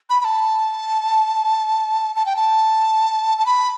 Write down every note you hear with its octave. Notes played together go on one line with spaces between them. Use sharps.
B5
B5
A5
A5
G5
A5
A5
B5